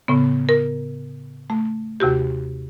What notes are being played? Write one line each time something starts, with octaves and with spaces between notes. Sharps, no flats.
A2 C#3 B3
A#4
A3
D#2 C3 F#4 G4